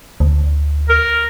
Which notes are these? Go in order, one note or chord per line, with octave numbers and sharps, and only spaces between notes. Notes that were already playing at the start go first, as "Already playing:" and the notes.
D2
A#4